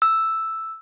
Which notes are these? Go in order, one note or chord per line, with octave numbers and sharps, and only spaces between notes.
E6